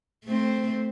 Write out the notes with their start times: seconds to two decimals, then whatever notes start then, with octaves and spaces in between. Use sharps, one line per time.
0.25 A3 C4